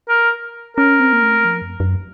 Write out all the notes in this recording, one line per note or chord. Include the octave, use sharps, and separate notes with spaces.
A#4
C#4 A#4
C4
A#3
A3
F3
F#2
F#2